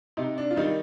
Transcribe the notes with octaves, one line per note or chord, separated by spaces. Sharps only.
C3 D#4
D4
F4
D#3 G3 D#4